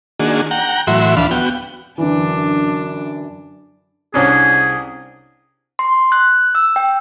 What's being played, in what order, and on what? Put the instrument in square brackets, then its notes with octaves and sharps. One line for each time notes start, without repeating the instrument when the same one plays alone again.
[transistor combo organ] D#3 A#3 D4 F#4 G#4
F#5 G5 A#5
A2 E3 F#3 F#4 E5 C6
D2 E3 F3 D4 F5 B5
B3 F#4 G5
[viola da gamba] F#2 D4 [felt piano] D3 E3
[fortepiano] C2 C#4 D4 [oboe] G#4
[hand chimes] C6
F#6
E6
G5